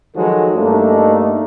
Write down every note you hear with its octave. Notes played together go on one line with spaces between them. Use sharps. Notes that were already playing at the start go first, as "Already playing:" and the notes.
D#3 F3 F#3 G#3 F#4 A4
G2 A3 A#3 D4 D#4